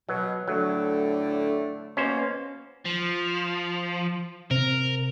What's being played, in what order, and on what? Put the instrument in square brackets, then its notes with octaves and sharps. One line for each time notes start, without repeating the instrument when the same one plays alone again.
[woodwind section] B2 [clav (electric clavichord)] F#3
[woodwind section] A2 D3 A3 [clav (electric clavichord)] F#3
[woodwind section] B2 A#3 [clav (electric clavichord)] C#4 C5
[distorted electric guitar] F3
[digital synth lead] C3 [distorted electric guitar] A#4